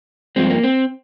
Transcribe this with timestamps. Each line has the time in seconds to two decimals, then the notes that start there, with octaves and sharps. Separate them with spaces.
0.36 G2 F3 G#3 C4
0.50 A#3
0.63 C4